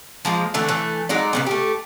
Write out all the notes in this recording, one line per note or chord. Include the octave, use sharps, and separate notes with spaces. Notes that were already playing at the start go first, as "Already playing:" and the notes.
F3 G#3 A#3
D3 E3 A3
E3 A3
F#3 G#3 D#4 D5
C#3 G3 B3
A3 G4